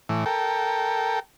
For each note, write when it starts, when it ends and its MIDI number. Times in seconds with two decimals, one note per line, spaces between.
0.09 0.25 45
0.09 0.25 52
0.26 1.20 69
0.26 1.20 70
0.26 1.20 79